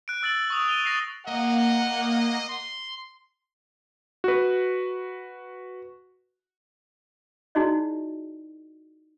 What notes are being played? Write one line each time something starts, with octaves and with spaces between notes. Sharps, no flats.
F#6 D7
E6 A6 D7 F#7
C#6 D#6 F7
D#7 F7 G7
E6 A6 A#6 C7 F7
A#3 D#5 F#5
C6
F#4 B4
D#4 E4 F#4 G#4 D5 D#5